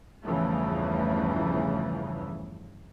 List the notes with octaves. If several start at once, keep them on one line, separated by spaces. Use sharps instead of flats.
G1 E2 C#3 E3 F3 A3